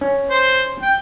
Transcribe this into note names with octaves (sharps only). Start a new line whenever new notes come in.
C#4
C5
G5